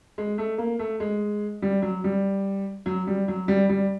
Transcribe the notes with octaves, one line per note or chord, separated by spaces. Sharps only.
G#3
A3
A#3
A3
G#3
G3
F#3
G3
F#3
G3
F#3
G3
G3